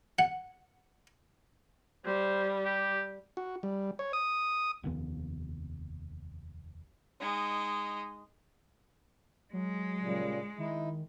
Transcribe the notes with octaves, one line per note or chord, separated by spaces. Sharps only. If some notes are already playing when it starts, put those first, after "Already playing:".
F#5
G3 C5
G4
F#4
G3
C#5
D#6
F1 D#2 B3
G#3 D#4
F#3 G#3
A#2 C#3 G3
D#3 D#4 E4